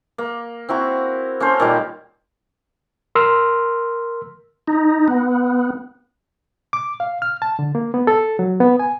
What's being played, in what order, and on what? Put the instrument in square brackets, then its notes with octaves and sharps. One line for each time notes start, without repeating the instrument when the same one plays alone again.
[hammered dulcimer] A#3
C4 E4 F#4 A#5
A#3 C#4 A4 C5
A#2 D#3 G3
[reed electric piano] A#4 C6 E6 F6
[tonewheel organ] D#4
B3
[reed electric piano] D6
F5
F6
A5
D3
A#3
B3
A4
F#3
B3
G#5